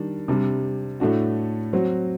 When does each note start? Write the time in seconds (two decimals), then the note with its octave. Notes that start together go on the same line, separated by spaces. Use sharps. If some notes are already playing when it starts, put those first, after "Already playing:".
Already playing: D#3 G3 D4
0.28 C3 G3 D4
1.00 A2 A3 D4 F#4
1.73 F#3 C4 F#4